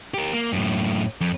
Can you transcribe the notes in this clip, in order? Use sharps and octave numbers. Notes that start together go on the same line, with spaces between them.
G4 A#4
A#3
F#2 A2
F2